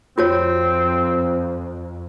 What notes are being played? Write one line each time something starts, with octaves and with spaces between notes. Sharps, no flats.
F2 C4 F4 F#4 C#5